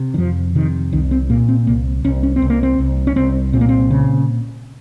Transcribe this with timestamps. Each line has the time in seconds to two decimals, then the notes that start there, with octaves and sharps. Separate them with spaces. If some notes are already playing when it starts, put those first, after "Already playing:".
Already playing: C3
0.14 D#3
0.18 F2 F3
0.55 C3 D#3
0.93 C2 D#3
1.11 C4
1.30 A#2 A#3
1.49 C4
1.67 C2 A#3
2.04 C2 C#4
2.23 C#4
2.36 C4
2.42 C2
2.50 A#3
2.63 C4
2.79 C2
3.07 C#4
3.16 C2 C4
3.53 A#2 C4
3.61 A#3
3.69 C4
3.90 C#3